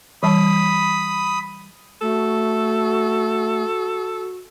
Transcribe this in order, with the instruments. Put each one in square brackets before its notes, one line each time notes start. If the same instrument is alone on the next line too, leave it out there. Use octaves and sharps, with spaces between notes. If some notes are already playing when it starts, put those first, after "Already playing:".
[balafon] E3 G3 A5 [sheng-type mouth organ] B5 D#6
[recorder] A3 [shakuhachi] F#4 [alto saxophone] A4